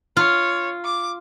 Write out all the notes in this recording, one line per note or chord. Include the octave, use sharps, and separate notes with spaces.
F4 C#5
D6